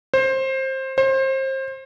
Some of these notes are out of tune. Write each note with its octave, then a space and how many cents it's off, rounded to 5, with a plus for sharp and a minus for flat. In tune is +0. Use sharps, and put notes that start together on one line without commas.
C5 +20
C5 +30